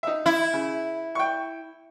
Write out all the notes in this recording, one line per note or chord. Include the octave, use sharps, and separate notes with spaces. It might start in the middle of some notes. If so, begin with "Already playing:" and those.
D#4 E5
E4
C#3
G5 C#6